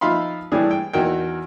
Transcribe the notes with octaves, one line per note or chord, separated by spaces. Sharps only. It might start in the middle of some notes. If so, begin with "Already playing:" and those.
F3 D#4 E5 F5 B5 C6
A2 E3 G3 D4 G#4
G5
E2 D#4 F#4 A#4 G5